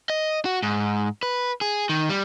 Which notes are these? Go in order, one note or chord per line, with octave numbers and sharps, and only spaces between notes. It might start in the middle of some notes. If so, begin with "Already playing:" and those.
D#5
F#4
G#2
B4
G#4
D#3
G3